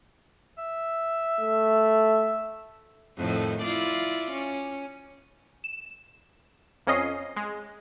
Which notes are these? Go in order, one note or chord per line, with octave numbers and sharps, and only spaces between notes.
E5
A3
F2 A2 D#3
E4 F4 D5
C#4
E7
F2 C#4 D#5 C7
G#3